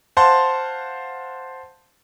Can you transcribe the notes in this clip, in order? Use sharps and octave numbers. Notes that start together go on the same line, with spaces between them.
C5 F5 F#5 A5 C6